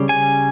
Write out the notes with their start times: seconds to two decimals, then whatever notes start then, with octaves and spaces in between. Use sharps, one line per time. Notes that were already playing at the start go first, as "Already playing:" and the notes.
Already playing: C#3 G3
0.09 G#5